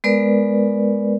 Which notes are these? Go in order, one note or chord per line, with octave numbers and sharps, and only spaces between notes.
G#3 B3 A#4 B4 D5